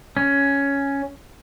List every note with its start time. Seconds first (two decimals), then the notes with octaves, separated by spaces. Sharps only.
0.17 C#4